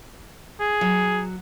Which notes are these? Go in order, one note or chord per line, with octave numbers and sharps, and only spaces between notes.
G#4
F#3